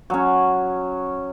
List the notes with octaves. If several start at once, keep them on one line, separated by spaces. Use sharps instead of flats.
F#3 C#4